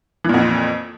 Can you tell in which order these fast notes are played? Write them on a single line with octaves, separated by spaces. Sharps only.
E3 A#2 F2